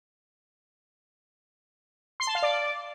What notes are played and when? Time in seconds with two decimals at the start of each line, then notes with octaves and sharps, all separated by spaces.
2.20 C6
2.27 A5
2.35 F5
2.43 D5